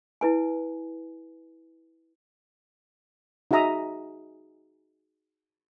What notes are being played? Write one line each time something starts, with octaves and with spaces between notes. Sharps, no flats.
E4 B4 G#5
D#4 F#4 G#4 E5 A#5 D#6